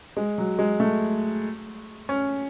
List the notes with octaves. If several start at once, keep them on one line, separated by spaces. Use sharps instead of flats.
G#3
F#3
G#3
A3
C#4